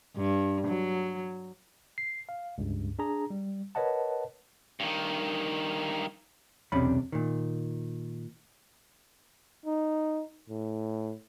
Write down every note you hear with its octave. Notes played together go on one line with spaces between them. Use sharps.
G2
F#3
C7
F5
C#2 G2
D4 G#4 A#5
G3
A#4 B4 C#5 D#5 F#5 A5
G2 D#3
B1 E2 C3 C#4 D4 B5
A#2 D#3
D#4
A2